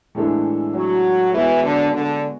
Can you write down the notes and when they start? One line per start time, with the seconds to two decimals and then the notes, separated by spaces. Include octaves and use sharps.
0.15 A2 E3 G#3 D4 A4
0.74 F#3
1.33 E3 G#3 B3 F#4 C#5
1.63 D3
1.92 D3